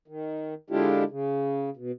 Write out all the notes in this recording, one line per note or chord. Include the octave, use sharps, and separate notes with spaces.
D#3
D3 G#3 D4 E4 F4 G4
C#3
B2